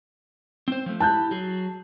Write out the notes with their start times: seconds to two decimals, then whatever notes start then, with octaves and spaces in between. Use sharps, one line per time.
0.68 C4 C5
0.86 F3 A3
1.00 E4 G4 A5 F#6 G6
1.31 F#3 G#4